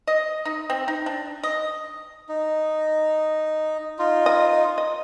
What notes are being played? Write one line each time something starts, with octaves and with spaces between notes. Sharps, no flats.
D#5
D#4
C4
D#4
D4
D#5
D#4
D#4 F4
D#5
D#5